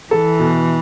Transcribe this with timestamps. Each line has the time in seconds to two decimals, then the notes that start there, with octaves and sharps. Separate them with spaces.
0.11 E3 A4
0.39 B2